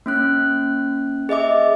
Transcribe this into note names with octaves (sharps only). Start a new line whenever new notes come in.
A#3 C#4 F#6
G#4 D#5 E5 D6